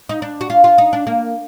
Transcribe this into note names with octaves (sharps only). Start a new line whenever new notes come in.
D#4
D4
F#4
F4
F4
D#4
D4
A#3